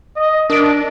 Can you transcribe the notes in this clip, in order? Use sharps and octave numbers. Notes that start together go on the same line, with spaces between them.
D#5
D4 A#4 D7